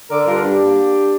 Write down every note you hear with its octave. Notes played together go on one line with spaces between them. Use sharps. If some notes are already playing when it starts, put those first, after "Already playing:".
D3 A#4 D5
G2 F4 A#4
G3 D4 G4
A#3